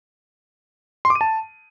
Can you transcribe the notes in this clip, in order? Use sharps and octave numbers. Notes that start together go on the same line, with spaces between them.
C6
D6
D#7
A5